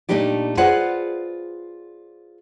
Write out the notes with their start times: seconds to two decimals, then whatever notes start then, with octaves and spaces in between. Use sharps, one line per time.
0.09 A#2 A3 D4 D#4 G4 D5
0.57 F4 G#4 B4 C5 D5 F#5